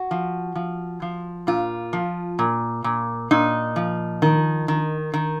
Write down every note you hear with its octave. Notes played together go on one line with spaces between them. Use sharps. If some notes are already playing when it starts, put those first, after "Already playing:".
Already playing: F#4
F3
F3
F3
A#2 F4
F3
A#2
A#2
A#2 D#4
F3
D#3
D#3
D#3